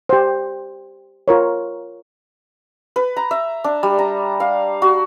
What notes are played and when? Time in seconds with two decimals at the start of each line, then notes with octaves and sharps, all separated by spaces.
0.09 G4 C5
1.28 F4 A#4 C#5
2.96 B4
3.17 A#5
3.31 E5
3.64 D4
3.83 G3
3.99 A#5
4.40 F5
4.82 F#4